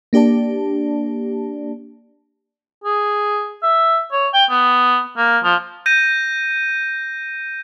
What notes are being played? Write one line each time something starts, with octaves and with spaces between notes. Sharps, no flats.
A#3 D4 G4 D5 A5
G#4
E5
C#5
G5
B3
A#3
F3
G6 A#6 D#7